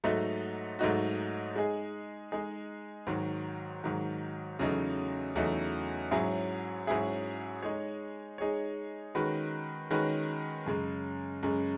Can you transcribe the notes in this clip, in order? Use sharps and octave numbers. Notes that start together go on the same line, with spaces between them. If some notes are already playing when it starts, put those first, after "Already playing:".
G#2 F#3 A3 D#4 F#4
G#2 F#3 A3 D#4 F#4
G#3 D#4 G#4
G#3 D#4 G#4
G#2 D#3 F#3
G#2 D#3 F#3
E2 C#3 F#3 A3 D#4
E2 C#3 F#3 A3 D#4
G#2 F#3 C#4 E4 G#4
G#2 F#3 C#4 E4 G#4
G#3 D#4 G#4 C#5
G#3 D#4 G#4 C#5
D#3 G#3 C#4 F#4 B4
D#3 G#3 C#4 F#4 B4
F#2 C#3 G#3
F#2 C#3 G#3